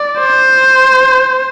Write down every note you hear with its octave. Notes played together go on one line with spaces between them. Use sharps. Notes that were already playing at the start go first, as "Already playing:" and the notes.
Already playing: D5
C5